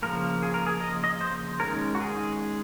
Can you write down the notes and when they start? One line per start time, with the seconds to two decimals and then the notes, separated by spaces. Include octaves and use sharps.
0.02 C#3 F3 A#3 A#4
0.43 G#4
0.54 A#4
0.66 G#4
0.81 D#5
1.04 D#5
1.21 C5
1.60 D#3 G#3 C#4 A#4
1.95 F#4
2.00 G#4